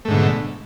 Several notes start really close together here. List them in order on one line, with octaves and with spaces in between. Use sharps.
A3 G#2 D3 B2